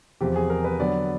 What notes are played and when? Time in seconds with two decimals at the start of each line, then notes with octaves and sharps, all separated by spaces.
0.21 E2 C3 F3 G4
0.36 G#4
0.50 A#4
0.64 B4
0.79 D3 F#3 B3 D5